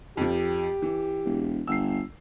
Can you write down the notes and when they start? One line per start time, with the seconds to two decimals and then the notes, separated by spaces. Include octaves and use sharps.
0.17 F2 F3 G4
0.82 E3
1.24 E1
1.67 G1 E6 C7